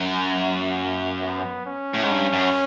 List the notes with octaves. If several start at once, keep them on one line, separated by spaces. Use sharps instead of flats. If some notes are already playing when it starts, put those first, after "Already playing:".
Already playing: F#2
A#3
B3
C#4
A2
G#2
G2
F#2